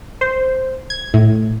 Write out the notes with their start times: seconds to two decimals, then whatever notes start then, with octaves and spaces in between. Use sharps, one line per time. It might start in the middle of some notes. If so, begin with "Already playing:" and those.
0.21 C5
0.90 G#6
1.14 A2